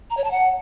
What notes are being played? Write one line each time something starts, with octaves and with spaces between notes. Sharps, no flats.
A#5
C#5
A5
F#5